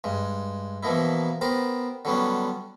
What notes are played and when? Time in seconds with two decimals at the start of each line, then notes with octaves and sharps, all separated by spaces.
0.04 G2 G#3
0.83 B2 E3 F3 A#3 D#4 E4
1.41 B3 G4 A#4 C5
2.05 D3 F#3 G3 B3 C#4 D4